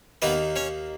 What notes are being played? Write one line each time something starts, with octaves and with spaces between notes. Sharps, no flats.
D#2 D#3 A#3 B3 D#4 B4
C#4 C#5